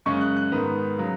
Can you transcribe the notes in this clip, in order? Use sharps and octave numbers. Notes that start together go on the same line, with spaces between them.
F#2 C#3 G#3 C#4 C#6
F#6
F#6
G#2 D#3 B3
C#3 F#3